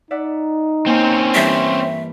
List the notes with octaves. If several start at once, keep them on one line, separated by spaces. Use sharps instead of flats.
D#4 D5 E5 F#5
A#3 C4 C#4
G2 E3 E5